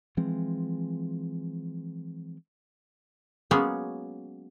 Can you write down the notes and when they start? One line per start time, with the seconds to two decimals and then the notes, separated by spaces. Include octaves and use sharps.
0.17 E3 F3 G#3 C4
3.51 F#3 G#3 A#3 B3 C#4 G#4